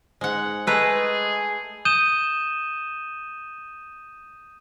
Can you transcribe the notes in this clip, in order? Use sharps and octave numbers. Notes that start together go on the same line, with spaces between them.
G#2 G#3 F#5
G#3 A3 G#4 B4 A#5
D#6 G6 D#7 E7 G7